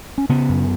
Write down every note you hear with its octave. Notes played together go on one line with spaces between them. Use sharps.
C#4
C#3 B3
F#2